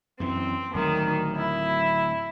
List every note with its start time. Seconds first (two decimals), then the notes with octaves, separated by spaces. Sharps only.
0.20 F#2 E3 C4
0.74 D1 D#3 F#3 A3
1.35 E4